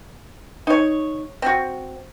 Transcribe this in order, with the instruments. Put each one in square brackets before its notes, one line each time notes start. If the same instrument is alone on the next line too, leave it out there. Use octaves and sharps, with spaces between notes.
[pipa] D#4 C#5
C4 F#4